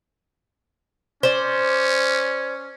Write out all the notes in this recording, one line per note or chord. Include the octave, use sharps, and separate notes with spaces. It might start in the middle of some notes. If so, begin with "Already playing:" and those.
C#4 C5 D5